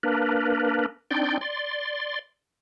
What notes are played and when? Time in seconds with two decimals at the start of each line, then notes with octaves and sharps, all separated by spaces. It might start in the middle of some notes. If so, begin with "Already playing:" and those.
0.03 A#3 D4 A#4 B4
1.11 C4 D4 D#4 D5 G5 C6
1.41 D5 C6